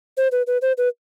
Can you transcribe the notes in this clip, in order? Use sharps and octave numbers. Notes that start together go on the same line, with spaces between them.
C5
B4
B4
C5
B4